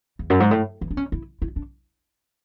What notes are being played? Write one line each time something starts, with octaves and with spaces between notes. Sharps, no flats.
E2
F#2
G#2
A2
E3
D4
C#4
E4
E4
D4